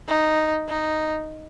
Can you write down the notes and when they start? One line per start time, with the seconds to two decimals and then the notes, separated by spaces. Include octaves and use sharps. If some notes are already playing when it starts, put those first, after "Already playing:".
0.08 D#4
0.69 D#4